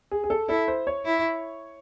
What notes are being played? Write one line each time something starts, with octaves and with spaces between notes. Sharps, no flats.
G#4
G#4
A4
E4 A4
C5
C#5
E4